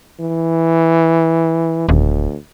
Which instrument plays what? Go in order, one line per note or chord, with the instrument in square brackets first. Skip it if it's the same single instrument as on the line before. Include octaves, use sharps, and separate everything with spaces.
[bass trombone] E3
[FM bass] D#1 [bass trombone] D2